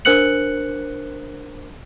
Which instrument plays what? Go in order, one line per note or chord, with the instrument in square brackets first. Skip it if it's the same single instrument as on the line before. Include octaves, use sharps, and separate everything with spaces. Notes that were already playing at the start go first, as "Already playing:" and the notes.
[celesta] D4 A#4 C5 F#6 C#7 F#7